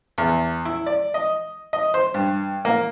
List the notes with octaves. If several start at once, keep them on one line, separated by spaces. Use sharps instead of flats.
E2
E4
D5
D#5
D#5
C5
G2
A#3